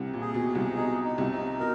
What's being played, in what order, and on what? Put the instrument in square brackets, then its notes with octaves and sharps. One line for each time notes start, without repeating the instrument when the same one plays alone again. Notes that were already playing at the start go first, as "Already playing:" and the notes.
Already playing: [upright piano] C2 C3
A#2
[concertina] G#4
[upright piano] B2
[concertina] G#4
[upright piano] C2 C3
[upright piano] B2 [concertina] D#4
[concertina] D#4
[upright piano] C2 C3
[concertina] D#4
[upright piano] B2 [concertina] A#4